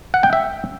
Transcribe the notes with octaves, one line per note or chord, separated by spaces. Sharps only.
F#5
G5
E5